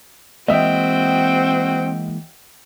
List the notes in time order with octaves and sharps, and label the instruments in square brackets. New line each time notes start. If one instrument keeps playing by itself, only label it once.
[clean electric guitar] E3 G#3 A#3 [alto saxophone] C4 [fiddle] F#4 G5 [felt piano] D#5 E5